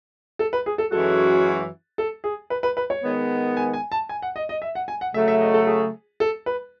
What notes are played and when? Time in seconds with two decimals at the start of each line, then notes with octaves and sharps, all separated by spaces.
0.39 A4
0.53 B4
0.66 G#4
0.78 A4
0.92 F#2 E3 G#3 C#4 F#4 A4
1.98 A4
2.24 G#4
2.50 B4
2.63 B4
2.77 B4
2.90 C#5
3.03 D#3 G#3 B3
3.57 G#5
3.73 G#5
3.92 A5
4.09 G#5
4.22 F#5
4.36 D#5
4.49 D#5
4.62 E5
4.75 F#5
4.88 G#5
5.01 F#5
5.14 C#3 F#3 A3 E5
5.28 E5
5.41 D#5
5.54 A4
5.67 G#4
6.20 A4
6.46 B4